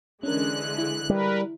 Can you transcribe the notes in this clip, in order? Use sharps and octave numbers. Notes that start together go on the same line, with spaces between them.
D3 E3 G#3 C#4 D4 A#4 F#6
E4
G3 A#4 B4